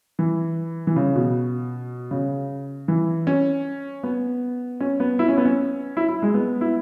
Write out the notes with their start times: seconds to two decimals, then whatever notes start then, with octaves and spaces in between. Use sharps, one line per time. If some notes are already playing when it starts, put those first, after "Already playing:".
0.19 E3
0.87 E3
0.96 C#3
1.16 B2
2.11 C#3
2.88 E3
3.27 C#4
4.03 B3
4.80 C#4
5.00 B3
5.19 E4
5.28 C#4
5.38 B3
5.45 C#4
5.97 E4
6.09 E4
6.22 G#3
6.34 B3
6.61 E4